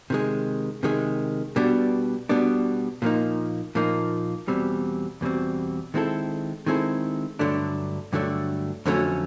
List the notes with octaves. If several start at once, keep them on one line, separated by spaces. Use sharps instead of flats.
C3 D#3 G#3
C3 D#3 G#3
B2 G3 B3 D4
B2 G3 B3 D4
A#2 F3 A#3 D#4
A#2 F3 A#3 D#4
E2 B2 G3 C4
E2 B2 G3 C4
D#3 G#3 C4 E4 A4
D#3 G#3 C4 E4 A4
G2 D3 F#3 A3 D4
G2 D3 F#3 A3 D4
F2 D3 F#3 A3 C#4